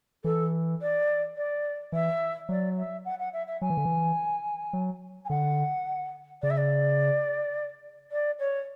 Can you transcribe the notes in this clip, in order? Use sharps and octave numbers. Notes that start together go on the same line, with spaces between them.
E3 A4
D5
D5
E3 E5
F#3 D5
E5
F#5
F#5
E5
E5
F#3 G#5
E3
D3
E3
F#3
G#5
D3 F#5
C#3 D5
E5
D5
D5
C#5